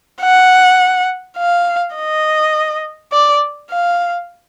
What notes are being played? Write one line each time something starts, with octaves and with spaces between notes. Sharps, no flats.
F#5
F5
D#5
D5
F5